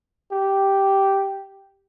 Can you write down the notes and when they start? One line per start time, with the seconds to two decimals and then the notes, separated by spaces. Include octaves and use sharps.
0.32 G4